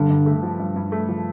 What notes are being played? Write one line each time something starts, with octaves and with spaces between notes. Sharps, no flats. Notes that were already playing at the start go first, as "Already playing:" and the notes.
Already playing: G2 D3
G2
A3
F3
G2
G2
A3
F3